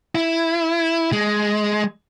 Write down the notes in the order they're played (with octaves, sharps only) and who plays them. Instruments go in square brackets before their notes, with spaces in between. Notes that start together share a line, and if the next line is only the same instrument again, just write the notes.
[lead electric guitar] E4
G#3